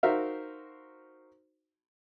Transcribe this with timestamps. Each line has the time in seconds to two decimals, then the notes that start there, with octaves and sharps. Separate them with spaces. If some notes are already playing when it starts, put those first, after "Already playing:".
0.03 D#4 F#4 A#4 C5 E5 F5